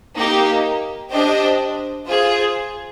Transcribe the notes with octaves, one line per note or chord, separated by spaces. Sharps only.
A#3 D#4 G4
D4 G4 C5 D#5
F4 G#4 C5